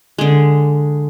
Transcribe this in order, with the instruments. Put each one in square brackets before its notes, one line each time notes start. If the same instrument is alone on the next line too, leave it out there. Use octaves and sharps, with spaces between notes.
[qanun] D3 G#3